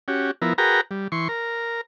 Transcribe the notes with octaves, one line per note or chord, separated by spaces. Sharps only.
C#4 F#4 G4
F3 B3 E4 A#4
F#4 G#4 A#4 B4 G5 A#5
G3
E3 C6 C#6
A#4